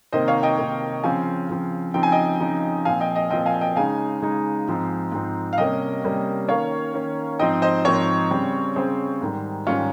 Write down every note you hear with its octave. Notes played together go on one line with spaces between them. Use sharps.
C3 D#3 A#3 C5 D#5
C#5 F5
D#5 G5
C3 D#3 A#3
C#3 F3 C4 F5 G#5
C#3 F3 C4
C#3 F3 C4 D#4 G5
G#5
D#5 G5
C#3 F3 C4 D#4
A#2 F3 C4 F5 G#5
D#5 G5
D#5 G5
A#2 F3 C4 D#5 G5
F5 G#5
D#5 G5
C#3 G#3 D#4 F5 G#5
C#3 G#3 D#4
G#2 F3 C4 D#4
G#2 F3 C4 D#4
F5
C3 G3 A#3 C#4 D#5 G5
C3 G3 A#3 C#4
D#3 A#3 C#4 C#5 F5
D#3 A#3 C#4
G#2 F3 C4 D#4 D#5 G5
C5 D#5
G#2 F3 C4 D#4 A#4 C#5
C#3 G3 C4
C#3 G3 C4 G#4 C5
G#2 D#3 G3
G#2 D#3 G3 C#4 F4